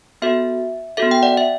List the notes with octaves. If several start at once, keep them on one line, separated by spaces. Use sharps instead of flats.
B3 F#4 A4 E5
B3 F#4 A4 E5
G5
D5 F#5
E5